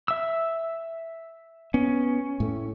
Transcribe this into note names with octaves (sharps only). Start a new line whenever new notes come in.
E5 E6
B3 C#4
A2 A3